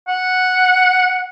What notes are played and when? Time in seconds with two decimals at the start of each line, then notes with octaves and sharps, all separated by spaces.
0.08 F#5